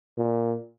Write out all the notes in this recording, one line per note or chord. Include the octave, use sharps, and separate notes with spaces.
A#2